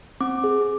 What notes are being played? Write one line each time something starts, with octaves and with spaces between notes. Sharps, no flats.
C4 D6
G#4